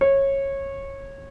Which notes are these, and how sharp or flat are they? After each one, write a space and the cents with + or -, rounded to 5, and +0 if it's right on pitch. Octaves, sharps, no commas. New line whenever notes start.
C#5 -20